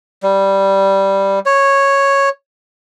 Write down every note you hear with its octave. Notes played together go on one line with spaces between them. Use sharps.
G3
C#5